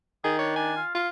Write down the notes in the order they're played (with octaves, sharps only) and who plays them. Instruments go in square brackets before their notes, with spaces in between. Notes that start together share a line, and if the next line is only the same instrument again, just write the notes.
[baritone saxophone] D#3 [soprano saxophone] G#4 [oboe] D#6
[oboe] D4 [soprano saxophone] C#5
[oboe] D4 [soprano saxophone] G#5
[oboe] F4
[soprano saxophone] F4 [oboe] F5